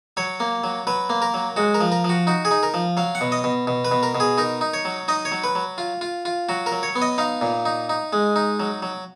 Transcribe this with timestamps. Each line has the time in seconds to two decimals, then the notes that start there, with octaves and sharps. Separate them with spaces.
0.17 F#3 C#5
0.40 A#3
0.64 F#3
0.87 F#3 B4
1.10 A#3
1.22 A#4
1.34 F#3
1.56 G#3 F#4
1.74 A#4
1.80 F3
1.92 A#4
2.04 F3 F#4
2.27 D#4 F#4
2.45 G#4
2.51 D#4
2.63 A#4
2.74 F3
2.97 F#3 F5
3.15 F#5
3.21 B2
3.32 D#5
3.44 B2
3.67 B2
3.85 B4
3.91 B2
4.03 A#4
4.15 B2
4.20 G#4
4.38 D#4 A#4
4.61 D#4
4.74 C#5
4.85 F#3
5.08 D#4 D#5
5.25 C#5
5.32 F#3
5.44 B4
5.55 F#3
5.78 F4
6.01 F4
6.25 F4
6.49 F#3 F#4
6.66 A#4
6.72 F#3
6.83 C#5
6.96 B3
7.02 D#5
7.18 D#4 F5
7.42 A#2
7.65 D#4
7.89 D#4
8.13 G#3
8.36 D#4
8.60 F#3
8.82 F#3